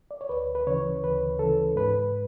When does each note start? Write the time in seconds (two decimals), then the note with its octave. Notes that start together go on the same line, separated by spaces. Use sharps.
0.11 D5
0.21 C#5
0.29 D2 B4
0.55 B4
0.67 C#3 E3 C#5
1.04 D2 B4
1.39 C#3 E3 A4
1.76 G#2 B4